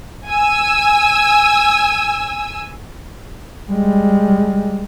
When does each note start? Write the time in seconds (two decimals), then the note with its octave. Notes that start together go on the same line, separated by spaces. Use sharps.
0.28 G#5 E6
3.70 G3 G#3